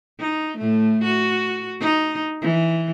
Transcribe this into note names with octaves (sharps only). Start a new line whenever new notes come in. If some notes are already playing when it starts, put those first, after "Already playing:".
D#4
A2 A3
F#4
D#4
E3